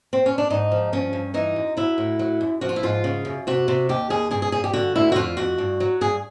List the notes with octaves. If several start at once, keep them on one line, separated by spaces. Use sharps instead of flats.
C4
C#4
D4
G#2 D#4
F3
G2 C#4
G2
E3 D#4
F#2
F#3 E4
A2
F#3
F#2
F3 F#4
F4
E4
G#2 F4
C#3
F#2
C3 F#4
C3
D#2 G4
D#2 G#4
G2 G#4
G#4
G2 G#4
G4
D3 F#4
D2 E4
F#4
F2 F4
F2 F#4
G2
F#3
G2 G#4